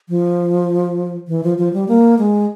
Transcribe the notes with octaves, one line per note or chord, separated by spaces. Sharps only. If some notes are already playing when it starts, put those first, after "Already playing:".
F3
E3
F3
F3
G3
A#3
G#3